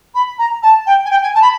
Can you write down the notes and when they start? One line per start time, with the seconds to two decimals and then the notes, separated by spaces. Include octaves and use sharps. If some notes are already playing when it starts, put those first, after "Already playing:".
0.14 B5
0.38 A#5
0.62 A5
0.86 G5
1.04 G#5
1.10 G5
1.22 G#5
1.34 A5
1.41 B5